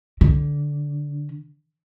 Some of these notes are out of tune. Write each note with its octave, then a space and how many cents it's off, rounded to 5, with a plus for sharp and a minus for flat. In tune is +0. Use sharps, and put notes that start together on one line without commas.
D3 -10